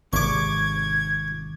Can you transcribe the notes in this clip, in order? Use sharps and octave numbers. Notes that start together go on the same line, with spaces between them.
G#1 C3 C#6 D6 G#6